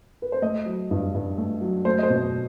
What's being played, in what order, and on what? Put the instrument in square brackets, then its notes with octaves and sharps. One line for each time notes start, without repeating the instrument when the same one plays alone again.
[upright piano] B4
C5
A3 D#5
F#3
G2
G2
A3
F#3
A3 C5
D#5
C5
B2